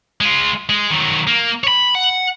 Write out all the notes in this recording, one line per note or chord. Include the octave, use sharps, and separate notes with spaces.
G#3 F4
G#3
D#3 F#3
A#3
C#5 B5
F#5